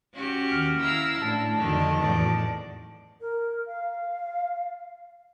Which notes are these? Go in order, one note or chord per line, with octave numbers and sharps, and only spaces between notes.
C#4 F#4 G4
D#2 F6
E4 F5 A#5 E6
A2 D4 A5
F2 D3 D#3 F#3 D#5
E2 A2 D5 A5
A#4
F5